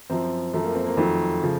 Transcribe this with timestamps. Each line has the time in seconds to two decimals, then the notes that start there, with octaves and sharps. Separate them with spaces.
0.10 F#2 F3 C4
0.54 F#2 F3 A3
0.64 A#3
0.75 C4
0.86 A#3
0.97 F2 D#3 F#3 A3
1.43 C#3 F3